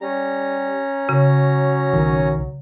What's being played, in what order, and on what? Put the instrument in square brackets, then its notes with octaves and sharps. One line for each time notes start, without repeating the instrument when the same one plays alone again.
[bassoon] G3 [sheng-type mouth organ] C#4 A#5
[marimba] C#3 [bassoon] F#3
[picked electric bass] B1 D#3